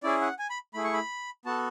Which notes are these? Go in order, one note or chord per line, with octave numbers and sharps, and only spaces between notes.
C#4 E4 G#4 D5
F#5
G#5
B5
A3 E4 G#4 B5
C#6
B5
B3 F#4 A4 A5